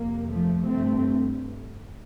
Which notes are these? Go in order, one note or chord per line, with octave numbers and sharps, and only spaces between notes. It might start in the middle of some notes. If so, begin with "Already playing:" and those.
Already playing: F2 C3 A#3
F3 A3
G2 A3 C4